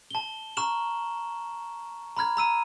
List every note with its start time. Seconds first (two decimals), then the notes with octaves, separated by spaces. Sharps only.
0.11 A5 G7
0.57 A#5 C#6 F6 E7 F#7
2.17 A#5 B5 F6 G#6
2.37 A#5 E6 D#7